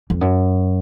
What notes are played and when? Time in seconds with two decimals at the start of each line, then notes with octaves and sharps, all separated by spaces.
0.10 F2
0.21 F#2